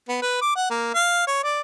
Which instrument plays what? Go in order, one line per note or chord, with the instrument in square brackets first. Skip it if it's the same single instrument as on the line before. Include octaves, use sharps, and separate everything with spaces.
[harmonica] B3
B4
D6
F#5
A#3
F5
C#5
D5